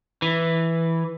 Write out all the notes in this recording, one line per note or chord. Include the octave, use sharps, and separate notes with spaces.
E3